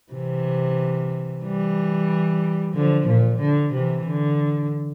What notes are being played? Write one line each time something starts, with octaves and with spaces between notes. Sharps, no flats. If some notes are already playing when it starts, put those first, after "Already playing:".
C3 E3
E3 G3
D3 F3
A#2
D3
C3 E3
D3